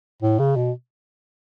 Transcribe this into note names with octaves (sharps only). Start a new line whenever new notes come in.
A2
C#3
B2